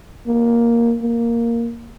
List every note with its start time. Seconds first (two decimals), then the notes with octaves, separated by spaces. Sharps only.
0.27 A#3
1.01 A#3